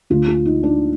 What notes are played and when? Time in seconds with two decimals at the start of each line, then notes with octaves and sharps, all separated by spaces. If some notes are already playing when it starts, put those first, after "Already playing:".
0.10 D2 D3 F4
0.28 F4
0.45 D#4
0.63 D4